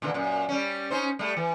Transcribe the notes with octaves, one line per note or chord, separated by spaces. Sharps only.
A#2 D3 E3
F#2 A#2
G3 C#4
C#4 D#4 C5
G3 A3
E3